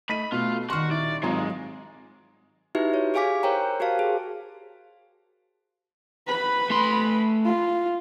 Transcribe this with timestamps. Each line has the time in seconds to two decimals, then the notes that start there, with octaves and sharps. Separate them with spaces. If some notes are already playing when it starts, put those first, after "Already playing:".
0.09 A3 D#5 B5 B6 D#7
0.32 B2 A3 F4
0.70 D#1 D#3 G3 F#4 C6 C#6 F6
0.91 E4 D5
1.23 G#1 F#3 G#3 F4 A#5
2.75 D#4 E4 F#4 G4 B4 E5
2.94 C#5
3.14 G4 G#4 F5 G#5 D6 B6
3.43 A#4 C5 C#5 G5 A#5
3.80 F#4 G4 A#4 C5 F5 A5
3.99 G#4
6.27 B4 B5
6.70 A3 C6
7.45 F4